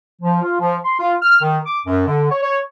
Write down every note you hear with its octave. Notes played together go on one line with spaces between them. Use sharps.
F3
F4
F3
C6
F4
F6
D#3
D6
F#2
D3
C#5
C#5